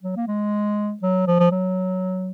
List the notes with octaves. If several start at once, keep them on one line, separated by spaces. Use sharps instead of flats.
F#3
A#3
G#3
F#3
F3
F3
F#3